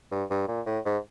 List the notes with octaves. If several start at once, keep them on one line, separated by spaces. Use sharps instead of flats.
G2
G2
A#2
A2
G#2